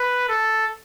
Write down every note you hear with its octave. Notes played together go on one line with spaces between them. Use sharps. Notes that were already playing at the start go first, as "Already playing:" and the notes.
Already playing: B4
A4